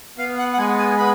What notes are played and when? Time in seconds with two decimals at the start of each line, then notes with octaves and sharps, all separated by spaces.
0.18 B3 F5
0.38 F#5
0.53 F#5
0.58 G#3 G#5
0.78 G#5
0.98 B3 B5